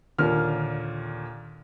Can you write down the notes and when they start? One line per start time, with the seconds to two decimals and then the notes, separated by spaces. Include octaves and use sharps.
0.19 D#2 A#2 D3 F6